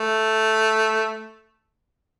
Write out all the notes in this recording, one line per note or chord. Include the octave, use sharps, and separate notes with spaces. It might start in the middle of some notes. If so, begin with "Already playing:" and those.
Already playing: A3